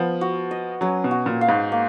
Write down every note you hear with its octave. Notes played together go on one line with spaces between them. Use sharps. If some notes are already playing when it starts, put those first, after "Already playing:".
Already playing: F3 B3
F#4
D#5
F#3 C#4
B2
F#4
A#2
F5
G#2
A#3